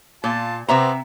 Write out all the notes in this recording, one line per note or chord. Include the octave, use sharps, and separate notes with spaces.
A#2 F4 A5
C3 B3 G4 C5 E5 A#5